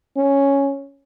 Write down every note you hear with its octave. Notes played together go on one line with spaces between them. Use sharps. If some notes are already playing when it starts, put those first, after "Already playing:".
C#4